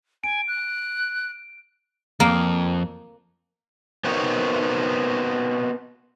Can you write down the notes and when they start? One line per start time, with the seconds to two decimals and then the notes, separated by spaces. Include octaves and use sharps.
0.24 G#5 D7
0.48 F#6
2.20 F2 A#3
4.04 B3 C4 D#4 F#4 A#4 C#5